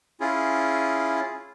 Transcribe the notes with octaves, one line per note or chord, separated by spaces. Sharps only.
C#4 E4 F4 G#4